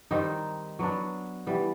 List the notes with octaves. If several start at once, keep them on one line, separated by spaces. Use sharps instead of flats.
D#3 G3 C4 D#4
F#3 B3 D4
E3 G3 B3